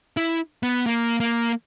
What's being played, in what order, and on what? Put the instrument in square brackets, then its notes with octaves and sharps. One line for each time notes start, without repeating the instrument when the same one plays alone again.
[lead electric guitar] E4
B3
A#3
A#3